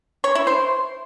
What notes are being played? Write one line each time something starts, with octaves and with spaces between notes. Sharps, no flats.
C#5
E4
C5